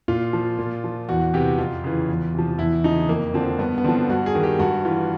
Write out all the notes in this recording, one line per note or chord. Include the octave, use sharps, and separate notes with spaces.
A#2 F4
F3
A#2
F3
E2 F#4
C3 E3 G4
F2 F4
C#3 E3
E2
C3 F3
E2 E4
C#3 F3 D#4
F2 A#3
D3 F3 C4
G2 B3
B3
D3 F3 C4
G2 F#4
G#4
D#3
G4
G2 F#4
E3 F4